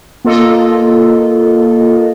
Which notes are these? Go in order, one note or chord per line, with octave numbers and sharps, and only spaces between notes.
A#3 F4 A4 D#5